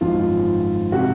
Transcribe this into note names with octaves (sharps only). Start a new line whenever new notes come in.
G#1 F#2 F3 F4
C3 F#4